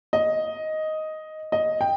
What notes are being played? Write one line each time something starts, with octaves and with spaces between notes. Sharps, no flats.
D#5
D#5
G5